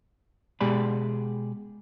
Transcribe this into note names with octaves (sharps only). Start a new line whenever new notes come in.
B2 G#3 G4 G#4 D5 B5